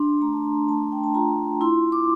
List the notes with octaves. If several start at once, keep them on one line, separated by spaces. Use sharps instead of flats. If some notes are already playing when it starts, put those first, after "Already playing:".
Already playing: D4 C6
A3 A#5
A5
A#5
A3 A5
G5
A5
F4 A#5
E4 C6
D6